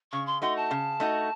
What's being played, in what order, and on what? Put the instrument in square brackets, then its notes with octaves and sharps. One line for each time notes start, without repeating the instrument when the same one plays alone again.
[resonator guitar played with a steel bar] C#3 [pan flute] C#6
[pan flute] C6
[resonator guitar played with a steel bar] A3 D#4 F#4 [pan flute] C6
[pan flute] A5
[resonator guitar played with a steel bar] C#3
A3 D#4 F#4